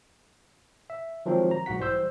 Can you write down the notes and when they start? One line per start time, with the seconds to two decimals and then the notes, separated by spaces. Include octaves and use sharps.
0.90 E5
1.26 D#3 F3 F#3 G#3 C4 G4
1.51 A#5
1.66 B1 G#2 F#4 F#5 B6
1.79 E3 G3 C5 E6 G6